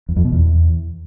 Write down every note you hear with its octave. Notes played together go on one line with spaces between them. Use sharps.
E2
F2
B2
E2